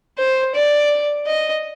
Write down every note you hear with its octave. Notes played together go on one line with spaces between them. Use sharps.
C5
D5
D#5